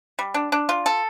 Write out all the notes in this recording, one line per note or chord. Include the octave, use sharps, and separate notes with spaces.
G3
D4
D4
F4
A4